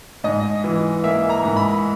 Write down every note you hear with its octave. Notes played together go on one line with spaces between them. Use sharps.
G#2 D#5
E3
A#3 E5
A#5
G#2
B5